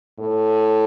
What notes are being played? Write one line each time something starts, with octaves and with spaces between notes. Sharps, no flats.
A2